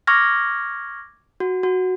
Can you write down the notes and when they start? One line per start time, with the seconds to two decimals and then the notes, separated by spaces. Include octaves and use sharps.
0.07 C#6 D6 F6 G#6 A#6
1.40 F#4
1.63 F#4